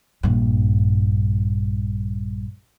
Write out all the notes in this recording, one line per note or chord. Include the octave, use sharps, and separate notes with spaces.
A#1 G2